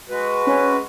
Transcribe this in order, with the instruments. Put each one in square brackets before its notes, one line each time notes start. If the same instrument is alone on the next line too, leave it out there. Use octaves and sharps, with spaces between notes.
[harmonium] G#3 F#4 B4
[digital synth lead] C#4